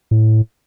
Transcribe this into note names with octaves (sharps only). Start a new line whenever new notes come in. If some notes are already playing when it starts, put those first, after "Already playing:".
A2